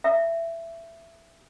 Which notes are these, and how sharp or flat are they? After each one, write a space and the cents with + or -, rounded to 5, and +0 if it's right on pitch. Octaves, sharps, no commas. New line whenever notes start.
E5 +15